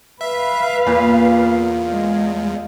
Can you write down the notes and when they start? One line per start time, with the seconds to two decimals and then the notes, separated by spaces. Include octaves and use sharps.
0.21 B4 E5 F5
0.87 E2 A#2
1.91 G#3